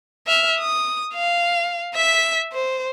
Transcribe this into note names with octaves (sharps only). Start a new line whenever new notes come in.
E5 F6
D#6
F5
E5 B6
C5